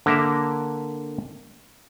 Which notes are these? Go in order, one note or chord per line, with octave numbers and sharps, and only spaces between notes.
D3 A#3 A#4 E5